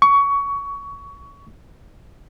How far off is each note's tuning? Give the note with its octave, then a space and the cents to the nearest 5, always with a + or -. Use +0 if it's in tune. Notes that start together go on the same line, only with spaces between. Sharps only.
C#6 +20